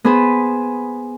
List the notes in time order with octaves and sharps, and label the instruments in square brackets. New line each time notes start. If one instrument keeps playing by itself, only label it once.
[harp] B3 G#4 B4 C5